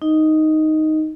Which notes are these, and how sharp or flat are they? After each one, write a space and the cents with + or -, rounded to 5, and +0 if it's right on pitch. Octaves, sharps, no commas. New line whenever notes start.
D#4 +0 D#5 +5